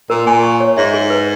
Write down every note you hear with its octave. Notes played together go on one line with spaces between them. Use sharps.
A#2 A#4
A#2 G#5
C#6
C#5
G#2 E5
G#4
B4